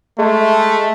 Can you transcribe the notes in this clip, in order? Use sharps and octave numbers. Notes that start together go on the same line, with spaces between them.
G#3 A3